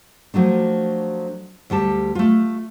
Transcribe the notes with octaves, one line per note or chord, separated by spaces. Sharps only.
F3 F#3 A3 D4
D2 G3 G4 A5
A3 F4